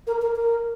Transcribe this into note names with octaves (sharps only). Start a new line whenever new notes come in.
A#4
A#4
A#4